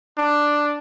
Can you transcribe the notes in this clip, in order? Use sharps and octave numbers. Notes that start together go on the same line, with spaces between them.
D4